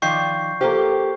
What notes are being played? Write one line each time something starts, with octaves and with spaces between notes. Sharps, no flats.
D#3 F3 D5 G5 C#6 G6 C7
A#3 F4 G4 A4 C5